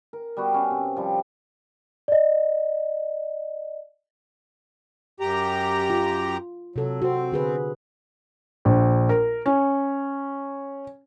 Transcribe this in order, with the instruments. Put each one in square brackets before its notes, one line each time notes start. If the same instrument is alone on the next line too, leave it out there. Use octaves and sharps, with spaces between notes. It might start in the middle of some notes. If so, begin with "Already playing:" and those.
[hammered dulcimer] A#4
G3 B3 F#4
C#4 F5
C3
F3 G3
[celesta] D5 D#5
[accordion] F#2 G4 A#5
[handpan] F4
[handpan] C3 A4 [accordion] F#3
[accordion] C4 [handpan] F#4 C5
[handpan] D3 G#4 B4
[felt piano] A#1
A#4
C#4